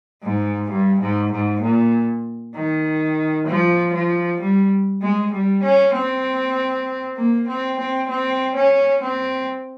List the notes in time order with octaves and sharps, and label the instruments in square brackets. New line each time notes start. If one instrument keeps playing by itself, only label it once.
[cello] G#2
G2
G#2
G#2
A#2
D#3
F3
F3
G3
G#3
G3
C#4
C4
A#3
C4
C4
C4
C#4
C4